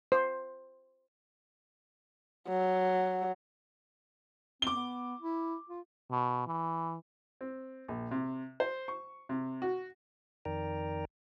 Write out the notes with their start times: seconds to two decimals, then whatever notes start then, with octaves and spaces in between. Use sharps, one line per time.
0.12 C5
2.48 F#3
4.62 C4 D6 G7
4.76 B3
5.20 E4
5.70 F4
6.11 B2
6.47 E3
7.41 C4
7.88 A#1
8.11 C3
8.60 C5
8.88 C#6
9.29 C3
9.62 F#4
10.45 F2 D#3 A#4 D5 G5 A#5